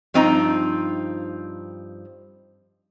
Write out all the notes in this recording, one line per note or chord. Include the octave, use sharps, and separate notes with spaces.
G2 F3 C4 D#4 A#5